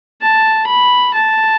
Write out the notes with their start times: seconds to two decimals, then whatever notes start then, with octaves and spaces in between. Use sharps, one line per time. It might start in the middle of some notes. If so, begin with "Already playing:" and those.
0.22 A5
0.67 B5
1.14 A5